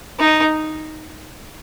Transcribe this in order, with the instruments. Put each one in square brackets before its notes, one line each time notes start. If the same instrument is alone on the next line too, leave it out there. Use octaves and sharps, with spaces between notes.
[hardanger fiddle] D#4